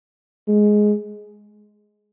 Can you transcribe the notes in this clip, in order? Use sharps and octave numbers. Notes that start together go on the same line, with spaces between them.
G#3